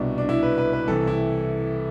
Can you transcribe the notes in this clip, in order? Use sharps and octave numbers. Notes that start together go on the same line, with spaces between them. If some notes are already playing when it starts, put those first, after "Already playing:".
Already playing: C2 B2 D4
D4
E4
B4
B4
B4
C2 C3 E3 A4
E4